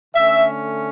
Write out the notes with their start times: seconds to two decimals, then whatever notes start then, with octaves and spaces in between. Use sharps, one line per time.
0.14 D3 A3 C#4 E5